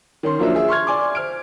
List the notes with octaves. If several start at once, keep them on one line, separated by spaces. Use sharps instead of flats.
D#3 C#4 C6
F3 F#3 A#3 D4 C5 E5
F4 G#4 E5
C6 C#6 F6 G#6
D5 G#5 C6 D6
C5 F6 D7